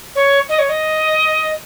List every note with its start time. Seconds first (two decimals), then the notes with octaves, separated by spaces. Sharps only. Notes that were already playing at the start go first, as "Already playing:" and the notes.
0.15 C#5
0.49 D#5
0.59 C#5
0.69 D#5